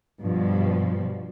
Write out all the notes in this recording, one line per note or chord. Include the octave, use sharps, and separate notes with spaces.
G2 B2 F3